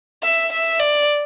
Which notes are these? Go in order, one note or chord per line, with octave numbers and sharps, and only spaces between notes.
E5
E5
D5